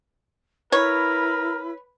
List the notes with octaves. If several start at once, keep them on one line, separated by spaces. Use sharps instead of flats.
E4 A#4 B4 C#5 B5